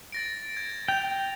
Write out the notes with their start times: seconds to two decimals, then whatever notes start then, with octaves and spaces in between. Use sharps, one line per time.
0.12 A6 A#6 D7
0.57 G#6
0.88 G5 F7